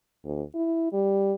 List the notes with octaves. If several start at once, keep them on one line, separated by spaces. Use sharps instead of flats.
D2
E4
G3